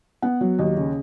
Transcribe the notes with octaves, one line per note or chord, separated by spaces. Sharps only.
B3 F#5
F#3
D#2 D#5
C#3